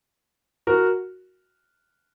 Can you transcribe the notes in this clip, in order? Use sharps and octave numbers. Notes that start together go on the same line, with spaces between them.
F#4 A#4